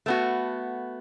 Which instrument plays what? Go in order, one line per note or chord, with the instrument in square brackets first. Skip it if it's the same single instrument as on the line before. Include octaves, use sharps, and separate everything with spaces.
[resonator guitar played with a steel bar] A3 B3 F#4